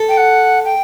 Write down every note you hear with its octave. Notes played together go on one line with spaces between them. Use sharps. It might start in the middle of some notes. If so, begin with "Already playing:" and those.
Already playing: A4
G5
F#5
G5